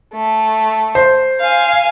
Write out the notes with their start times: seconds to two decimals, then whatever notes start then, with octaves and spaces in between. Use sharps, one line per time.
0.14 A3
0.95 C5
1.40 F5 G#5